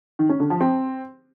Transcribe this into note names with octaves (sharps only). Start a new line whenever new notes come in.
D#3
C#4
D3
F3
C4